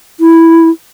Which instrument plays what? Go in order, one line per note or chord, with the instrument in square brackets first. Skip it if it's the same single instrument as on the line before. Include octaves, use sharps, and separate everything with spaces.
[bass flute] E4